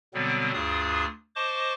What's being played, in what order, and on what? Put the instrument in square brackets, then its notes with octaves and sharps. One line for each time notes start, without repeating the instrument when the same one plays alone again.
[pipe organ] B2 D3 F#3 G3 B3 C4
D2 G2 D4 F4 G#4 D#6
C5 D#5 A5 C#6 D6